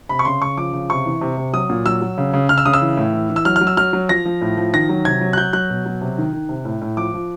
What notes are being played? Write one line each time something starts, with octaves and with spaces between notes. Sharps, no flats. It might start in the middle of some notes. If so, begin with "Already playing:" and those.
C3 B5
C#6
C#3 C6
C#3 C#6
F3 D6
C#3
C3 C#6
E3
C3
C3
F#3 D#6
A#2
F#3 E6
F#3
C#3
C#3
C#3 F6
E6
C#3 D#6
E6
E3
A2
E3
E3
E6
F#3 F6
F6
F#3
E6
F#3 F6
F#3
F3 A#6
F3
A2
F3
D#3 A#6
F#3
C3 G#6
F#3
F#6
F#3 G6
F#3 F#6
B2
F#3
C3
D#3
D#3
C3
A2
A2
F3 D6
F3